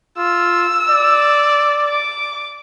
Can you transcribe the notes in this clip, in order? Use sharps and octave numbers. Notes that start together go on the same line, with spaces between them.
F4 E6
D5
D6